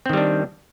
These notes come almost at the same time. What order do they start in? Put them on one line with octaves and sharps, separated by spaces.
C4 D#3 G3 D4